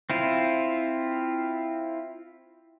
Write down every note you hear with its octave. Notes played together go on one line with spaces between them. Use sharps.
C4 E4 F4